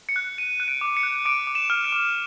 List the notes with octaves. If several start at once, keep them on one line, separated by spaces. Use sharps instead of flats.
C#7
F#6
F#6 D#7
F#6
D7
D6
C#7
F#6
D6 D7
D6
E7
F6
D7
D6